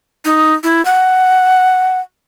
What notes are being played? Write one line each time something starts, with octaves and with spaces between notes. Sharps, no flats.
D#4
E4
F#5